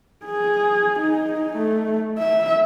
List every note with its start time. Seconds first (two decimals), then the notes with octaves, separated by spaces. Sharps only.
0.25 G#4
1.00 D#4
1.57 A3
2.18 E5